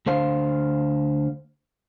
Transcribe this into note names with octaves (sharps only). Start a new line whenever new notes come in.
D2 D3 C5 F5